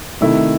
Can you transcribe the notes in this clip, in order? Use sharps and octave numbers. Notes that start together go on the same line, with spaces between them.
C3 D#3 A3 E4